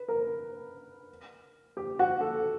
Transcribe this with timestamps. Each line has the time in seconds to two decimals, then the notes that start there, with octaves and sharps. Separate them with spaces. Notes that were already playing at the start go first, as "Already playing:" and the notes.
Already playing: B4
0.08 A#4
1.77 G4
1.99 F#4
2.21 A4